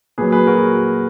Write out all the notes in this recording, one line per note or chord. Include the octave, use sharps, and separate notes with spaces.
A#2 F#3 G#4 B4
G#4 B4
F#4 A#4